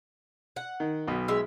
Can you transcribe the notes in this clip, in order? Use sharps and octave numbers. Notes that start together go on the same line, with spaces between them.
F#5
D#3
B1 B2
G#3 E5